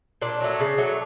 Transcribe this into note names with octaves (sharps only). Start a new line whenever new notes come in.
A#2 D4
F#3 A3
C#3
F#3 A3